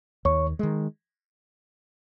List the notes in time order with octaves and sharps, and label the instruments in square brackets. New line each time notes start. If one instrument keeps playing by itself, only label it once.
[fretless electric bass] D#2 [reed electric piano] C#5 C#6
[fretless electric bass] D#3 G#3